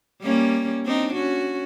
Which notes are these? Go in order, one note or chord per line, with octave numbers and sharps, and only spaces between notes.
G3 A#3 C#4
C4 D4 D#4
C#4 F#4